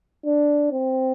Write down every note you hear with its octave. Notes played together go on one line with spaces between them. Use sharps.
D4
C4